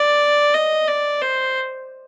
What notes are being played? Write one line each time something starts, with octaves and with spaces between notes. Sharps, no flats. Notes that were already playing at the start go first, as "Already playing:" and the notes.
Already playing: D5
D#5
D5
C5